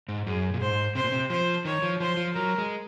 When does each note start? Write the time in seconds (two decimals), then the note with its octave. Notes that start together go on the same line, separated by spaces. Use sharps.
0.09 G#2
0.27 F#2 G#4
0.54 A#2
0.61 G#2 C5
0.95 C3 C5
1.04 A#2
1.12 C3
1.30 F3 C5
1.65 D#3 C#5
1.82 F3
2.00 F3 C5
2.17 F3
2.34 F#3 A#4
2.58 G#3